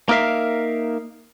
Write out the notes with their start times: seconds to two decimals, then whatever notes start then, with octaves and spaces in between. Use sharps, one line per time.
0.09 A#3 D#4 A#4 E5 F5